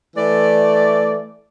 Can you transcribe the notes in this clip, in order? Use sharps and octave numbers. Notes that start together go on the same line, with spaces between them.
E3 A3 D5